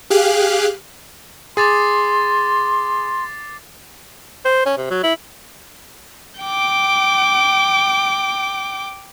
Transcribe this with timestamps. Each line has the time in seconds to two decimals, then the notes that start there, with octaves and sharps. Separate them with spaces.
0.10 G4 G#4 F5 F#6
1.57 G#4 C6 D6 A6 C7
4.45 C5
4.66 C#4
4.77 C3
4.90 F#3
5.03 E4
6.41 G5 D6